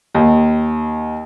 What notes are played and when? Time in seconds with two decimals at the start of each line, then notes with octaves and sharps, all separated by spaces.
0.15 D#2